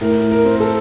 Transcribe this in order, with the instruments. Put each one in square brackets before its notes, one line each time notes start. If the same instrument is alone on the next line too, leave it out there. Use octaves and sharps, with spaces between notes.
[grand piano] A2 A#4
A#4
C4
A#4
A4